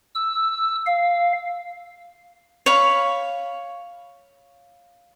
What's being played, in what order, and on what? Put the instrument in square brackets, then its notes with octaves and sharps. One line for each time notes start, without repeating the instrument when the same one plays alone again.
[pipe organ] E6
F5
[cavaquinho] C#5 F5 B5